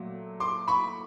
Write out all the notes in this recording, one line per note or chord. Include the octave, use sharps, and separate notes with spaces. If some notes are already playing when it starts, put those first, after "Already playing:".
Already playing: A#2 F#3 A3
C6 D6
B5 C#6